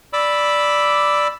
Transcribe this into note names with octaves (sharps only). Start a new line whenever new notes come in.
D5 B5 D6 E6